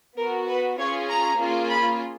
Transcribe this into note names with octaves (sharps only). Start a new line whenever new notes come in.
B3 F#4 A#4
B4
C#4 F4 G#4 C#5
A#5
A#3 C#4 F4 G#4
B5